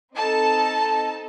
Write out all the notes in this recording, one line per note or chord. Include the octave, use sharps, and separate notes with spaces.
C4 D#4 A4 A5